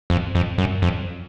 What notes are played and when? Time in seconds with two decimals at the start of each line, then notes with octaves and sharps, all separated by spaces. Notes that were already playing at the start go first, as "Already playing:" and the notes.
0.10 F2
0.35 F2
0.58 F#2
0.82 F2